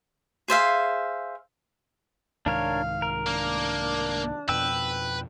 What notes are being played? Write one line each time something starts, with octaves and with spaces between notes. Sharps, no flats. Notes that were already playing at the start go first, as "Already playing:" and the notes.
G#4 C5 E5 F5
C2 G#2 D#3 D4 A#4 C#5 F5
A#4
A#3 D4
F2 B2 F3 B4 G5 E6